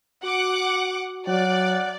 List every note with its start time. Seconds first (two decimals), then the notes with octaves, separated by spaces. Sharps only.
0.23 F#4 F#5 D6
1.28 F#3 D5 F#5